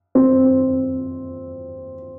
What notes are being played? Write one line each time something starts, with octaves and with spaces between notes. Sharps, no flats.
C4